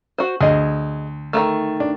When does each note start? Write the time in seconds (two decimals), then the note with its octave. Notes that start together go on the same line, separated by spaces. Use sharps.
0.18 F#4 C5
0.41 D2 G#4 D#5
1.33 D#3 F3 A3
1.80 D4